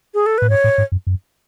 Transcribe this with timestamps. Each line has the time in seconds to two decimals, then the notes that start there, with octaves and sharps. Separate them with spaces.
0.14 G#4
0.26 A4
0.38 A2 B4
0.50 G#2 C#5
0.64 A2
0.78 G#2
0.92 F#2
1.07 F#2